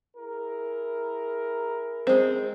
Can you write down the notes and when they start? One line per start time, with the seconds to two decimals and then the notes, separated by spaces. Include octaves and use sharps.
0.17 E4 G#4 A#4
2.07 G#3 C4